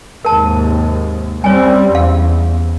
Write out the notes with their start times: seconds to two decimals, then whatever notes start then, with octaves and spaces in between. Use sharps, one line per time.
0.25 D#2 G#2 C3 A#4 A5
1.44 G3 C4 C#4 C#5 G#5
1.95 E2 F5